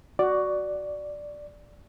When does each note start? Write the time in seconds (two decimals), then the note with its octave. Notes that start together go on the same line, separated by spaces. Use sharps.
0.19 F#4 D5